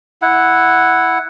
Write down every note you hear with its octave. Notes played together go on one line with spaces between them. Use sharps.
E4 F#5